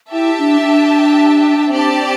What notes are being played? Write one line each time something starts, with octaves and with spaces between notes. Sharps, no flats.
E4 G4 E5 A5
D4
D4
C4 G4 D5 A5